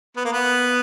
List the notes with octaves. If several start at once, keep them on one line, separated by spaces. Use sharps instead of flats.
B3
A#3
B3